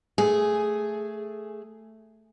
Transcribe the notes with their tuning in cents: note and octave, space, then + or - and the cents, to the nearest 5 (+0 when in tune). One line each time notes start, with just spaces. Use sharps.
A3 +0 G#4 +0